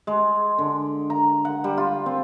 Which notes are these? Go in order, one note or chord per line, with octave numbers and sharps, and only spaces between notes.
G#3
D3
A#5
F#5
G3
F4
C4